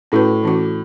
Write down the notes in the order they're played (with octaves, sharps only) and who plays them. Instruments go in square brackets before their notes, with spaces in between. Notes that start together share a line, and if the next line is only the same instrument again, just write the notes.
[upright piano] A2 [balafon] C#4 F#4 B4
[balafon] E3 C#4 F#4